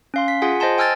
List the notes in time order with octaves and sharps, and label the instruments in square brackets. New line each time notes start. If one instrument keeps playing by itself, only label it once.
[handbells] C#4 F5 C6
B6
F4 G#4 F#5 G#5
C5 D#5 G#5 A5 C6
G5 G#5 E6 F6 G#6 A6